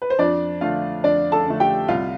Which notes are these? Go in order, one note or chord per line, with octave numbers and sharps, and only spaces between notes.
B4
C5
F2 D4 D5
D3 A3 F4 F5
F2 D4 D5
A4 A5
D3 A3
G4 G5
C2 F4 F5